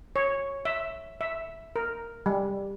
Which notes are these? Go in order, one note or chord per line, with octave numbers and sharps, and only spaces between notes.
C#5
E5
E5
A#4
G3